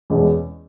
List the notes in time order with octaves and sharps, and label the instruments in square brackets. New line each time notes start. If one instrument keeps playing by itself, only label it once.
[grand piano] E2 B2 G#3 C#4 E4